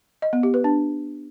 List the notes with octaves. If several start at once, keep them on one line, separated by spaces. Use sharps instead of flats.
D#5
B3
G4
B4
D4